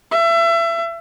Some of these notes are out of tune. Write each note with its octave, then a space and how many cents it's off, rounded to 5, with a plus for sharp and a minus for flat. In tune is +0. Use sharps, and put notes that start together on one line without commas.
E5 +30